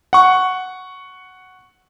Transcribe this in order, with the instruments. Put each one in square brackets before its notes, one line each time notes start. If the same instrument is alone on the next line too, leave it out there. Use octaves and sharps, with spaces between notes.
[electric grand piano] F#5 C#6